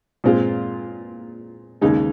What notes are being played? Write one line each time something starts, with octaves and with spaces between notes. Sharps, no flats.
A#2 G#3 C4 F4
D#2 C#3 G#3 D#4